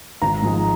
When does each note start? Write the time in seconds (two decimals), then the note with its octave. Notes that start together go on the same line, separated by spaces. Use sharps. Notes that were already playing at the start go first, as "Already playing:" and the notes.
0.22 G#1 A#5
0.42 G#2 F3 G#3